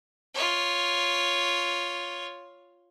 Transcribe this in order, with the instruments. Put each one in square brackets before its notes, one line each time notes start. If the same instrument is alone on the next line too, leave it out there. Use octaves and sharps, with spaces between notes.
[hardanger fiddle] F4 C#5